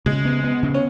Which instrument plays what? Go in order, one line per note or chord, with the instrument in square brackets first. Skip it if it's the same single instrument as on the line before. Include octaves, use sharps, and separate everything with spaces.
[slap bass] C#3 [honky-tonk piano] G#3
[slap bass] B3
B3
C#3
[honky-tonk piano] C#4